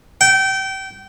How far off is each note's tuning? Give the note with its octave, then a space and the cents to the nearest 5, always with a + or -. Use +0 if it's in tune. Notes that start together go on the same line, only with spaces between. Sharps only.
G5 -25